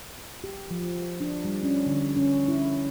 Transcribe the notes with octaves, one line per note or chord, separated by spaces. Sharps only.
G4
F3
D4
G3
C#4
D3
C#4
E4